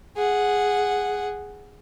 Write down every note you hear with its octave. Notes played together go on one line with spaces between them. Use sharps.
G#4 F#5